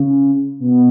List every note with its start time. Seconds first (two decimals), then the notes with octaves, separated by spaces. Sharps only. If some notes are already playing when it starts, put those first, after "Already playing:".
Already playing: C#3
0.60 B2